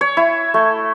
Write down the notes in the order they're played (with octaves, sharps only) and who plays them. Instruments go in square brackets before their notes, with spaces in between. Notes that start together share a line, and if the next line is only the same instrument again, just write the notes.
[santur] C#5
E4
A3